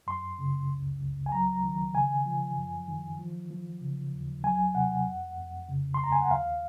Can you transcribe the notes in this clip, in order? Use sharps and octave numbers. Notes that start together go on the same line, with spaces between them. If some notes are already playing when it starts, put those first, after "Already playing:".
F#2 C6
C#3
C#2
C#2
G#5
F#3 A#5
D#3
C#3 G#5
F3
F#2
D#3
F3
F3
C#3
D#2
F#3 G#5
C3 F#5
F2
F2
C#3
C6
D#2 A#5
G#5
F#5
D#2 F5